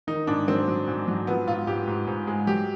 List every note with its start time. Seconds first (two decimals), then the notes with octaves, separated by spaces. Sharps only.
0.07 D#3 D#4
0.27 G#2 D4
0.48 F#3 C4
0.68 F#3
0.88 G#2
1.08 F#3
1.27 F3 B3
1.47 G#2 F4
1.67 G#2 G4
1.87 G#2
2.07 G#2
2.27 G#3
2.47 F#3 G4